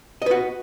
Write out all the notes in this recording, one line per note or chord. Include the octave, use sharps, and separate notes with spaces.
F#4 B4 D#5